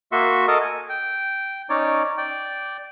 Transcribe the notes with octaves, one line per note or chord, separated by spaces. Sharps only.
A#3 F#4 E5 C6 C#6
A4 A#4 D#5 A5
G#5
G5
C#4 D#4 C#5 D5
D5 G5